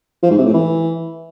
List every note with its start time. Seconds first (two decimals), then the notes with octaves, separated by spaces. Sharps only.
0.23 F3
0.31 G#2
0.38 C3
0.46 A2
0.53 E3